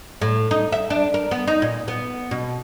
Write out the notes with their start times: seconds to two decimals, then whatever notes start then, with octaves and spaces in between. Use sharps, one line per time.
0.22 A2
0.51 D#4
0.72 E5
0.90 D4
1.14 A#4
1.31 B3
1.47 D#4
1.62 A#2
1.88 B3
2.31 B2